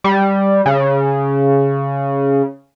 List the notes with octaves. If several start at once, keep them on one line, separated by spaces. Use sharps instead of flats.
G3
C#3